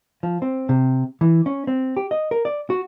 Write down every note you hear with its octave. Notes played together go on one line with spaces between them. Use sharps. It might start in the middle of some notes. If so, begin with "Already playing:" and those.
F3
C4
C3
E3
C#4
C4
G4
D#5
A#4
D5
F#4